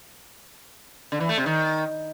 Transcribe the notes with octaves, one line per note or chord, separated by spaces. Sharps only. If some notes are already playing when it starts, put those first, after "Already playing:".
D3
E3
A3
C3
D#3